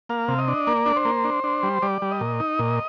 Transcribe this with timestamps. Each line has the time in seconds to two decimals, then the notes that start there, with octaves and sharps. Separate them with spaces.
0.09 A#3 F5
0.28 C3
0.38 D#5
0.48 D4
0.67 A#3 D5
0.86 D4
0.96 C5
1.05 A#3
1.24 D4
1.44 D4
1.63 G3
1.82 G3 D5
2.02 G3
2.11 D#5
2.21 A#2
2.40 D#4
2.59 A#2